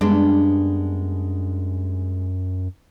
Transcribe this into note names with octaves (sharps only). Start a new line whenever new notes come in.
F#2 G3 G#3 B3 D4